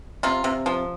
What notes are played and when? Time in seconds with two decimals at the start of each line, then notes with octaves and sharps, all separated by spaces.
0.23 C3 F4
0.44 C3
0.66 F3